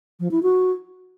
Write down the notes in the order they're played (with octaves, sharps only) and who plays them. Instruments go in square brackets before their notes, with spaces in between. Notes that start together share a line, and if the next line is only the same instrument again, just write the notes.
[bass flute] F3
E4
F#4